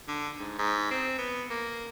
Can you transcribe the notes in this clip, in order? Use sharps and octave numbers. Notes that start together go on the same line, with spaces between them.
D3
G#2
G#2
C4
B3
A#3